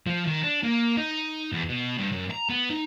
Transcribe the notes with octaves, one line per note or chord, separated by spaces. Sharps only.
F3
D#3
D4
A#3
D#4
E2
B2
G2
F#2
A#5
B3
D#4